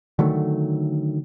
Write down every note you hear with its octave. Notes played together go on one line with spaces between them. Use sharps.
D3 D#3 F#3 A3